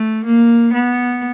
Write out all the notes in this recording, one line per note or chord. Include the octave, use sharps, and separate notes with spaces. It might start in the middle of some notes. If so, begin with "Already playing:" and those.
Already playing: A3
A#3
B3